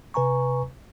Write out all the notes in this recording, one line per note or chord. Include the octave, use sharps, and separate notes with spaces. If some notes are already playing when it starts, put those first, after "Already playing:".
C3 B4 G#5 A#5 C#6